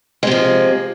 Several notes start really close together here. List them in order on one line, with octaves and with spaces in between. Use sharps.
G#3 C3 F3